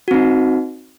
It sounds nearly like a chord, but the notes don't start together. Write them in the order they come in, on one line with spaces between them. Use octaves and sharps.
F#4 C4 D#4